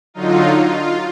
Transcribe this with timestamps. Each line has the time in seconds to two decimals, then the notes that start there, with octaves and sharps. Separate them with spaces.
0.14 D3 F#3 D#4 F4
0.64 F4